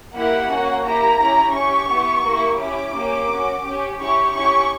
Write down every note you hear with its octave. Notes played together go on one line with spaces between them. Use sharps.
A#3 E4 G4 F#5
A#3 C#4 F#4
A#3 E4 G4 A#5
C#4 E4 G4
C#4 G4 C#6
B3 E4 G4
A#3 E4 G4
C#4 E4 G4 D6
A#3 C#4 G4
C#4 F#4
C#4 G4
C#4 E4 G4 C#6
C#4 E4 G4 C#6